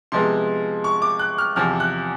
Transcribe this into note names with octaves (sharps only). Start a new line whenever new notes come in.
C3 F3 G#3 B3 C6
C#6
D6
F#6
F6
E2 C3 F3 F6
F#6